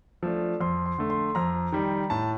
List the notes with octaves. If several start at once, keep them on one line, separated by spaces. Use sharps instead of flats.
F3 A3 D4
F2 C6
C6
D3 A3
C6
F2 A#5
D#3 G3
A2 A5